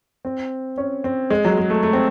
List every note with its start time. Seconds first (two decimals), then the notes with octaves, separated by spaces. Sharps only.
0.25 C4
0.78 C#4
1.04 C4
1.30 G#3
1.45 F#3
1.58 G#3
1.70 A3
1.83 A3
1.93 C4